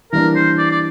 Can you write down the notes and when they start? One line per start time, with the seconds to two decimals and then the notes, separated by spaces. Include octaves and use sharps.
0.12 E3 G3 A#3 D4 A#4
0.35 C5
0.58 D5
0.71 D5